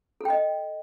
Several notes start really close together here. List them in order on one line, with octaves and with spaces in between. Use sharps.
A4 G5 D#5